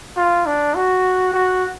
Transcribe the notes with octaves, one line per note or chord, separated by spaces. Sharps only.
F4
D4
F#4
F#4